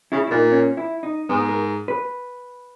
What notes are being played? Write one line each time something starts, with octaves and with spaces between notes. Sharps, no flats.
C#3 E4
E4
A#2 D#4
C#4
E4
D#4
G#2 B3
A#4
B4